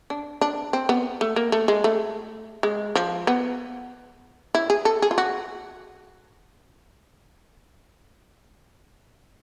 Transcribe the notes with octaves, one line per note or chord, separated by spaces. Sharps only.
D4
D4
C4
B3
A3
A#3
A3
G#3
A3
G#3
F3
B3
E4
G#4
A4
G#4
F4
F#4